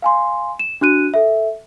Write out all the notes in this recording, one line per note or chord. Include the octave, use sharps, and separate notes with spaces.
F5 G#5 C6
E7
D4 F#4 F#6 D#7
A4 E5